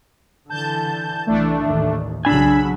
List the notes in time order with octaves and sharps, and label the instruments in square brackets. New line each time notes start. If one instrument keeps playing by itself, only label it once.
[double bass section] D3 E3 [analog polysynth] A5 G6
[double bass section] C2 E3 [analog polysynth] A3 D4
[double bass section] A1 D#2 D#3
[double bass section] B1 C#3 F#3 [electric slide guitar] D4 G#5 [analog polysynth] B5 E6